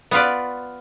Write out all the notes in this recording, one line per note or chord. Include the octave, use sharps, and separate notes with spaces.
B3 F4 B4 D5